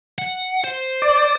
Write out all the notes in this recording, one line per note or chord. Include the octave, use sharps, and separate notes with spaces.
F#5
C5
D5